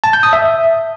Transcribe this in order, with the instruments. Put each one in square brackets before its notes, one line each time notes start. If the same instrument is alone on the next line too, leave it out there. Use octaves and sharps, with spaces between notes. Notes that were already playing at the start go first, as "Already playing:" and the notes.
[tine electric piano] A5
G6
D#6
E5